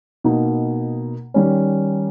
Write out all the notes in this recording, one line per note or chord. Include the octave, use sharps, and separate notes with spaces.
B2 A#3 D#4
D#3 G3 C#4